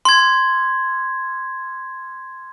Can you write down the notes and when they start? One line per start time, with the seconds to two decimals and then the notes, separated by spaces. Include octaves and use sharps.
0.05 C6 G#6